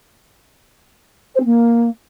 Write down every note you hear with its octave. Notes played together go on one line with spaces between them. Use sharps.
C5
C4
A#3